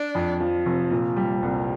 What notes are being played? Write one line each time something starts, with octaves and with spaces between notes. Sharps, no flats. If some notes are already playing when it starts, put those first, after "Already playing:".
Already playing: D4
F2
F3
F1
A#2
G3
C2